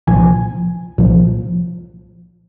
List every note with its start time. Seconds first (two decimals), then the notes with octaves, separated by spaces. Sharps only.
0.07 C2 A#2 F3 G#5
0.98 C2 A#2 F3